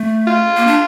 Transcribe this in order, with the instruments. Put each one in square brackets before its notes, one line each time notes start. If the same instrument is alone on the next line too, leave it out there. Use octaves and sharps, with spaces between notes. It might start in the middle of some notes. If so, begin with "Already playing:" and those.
Already playing: [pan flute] A3
[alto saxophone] F4
[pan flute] A#3
D4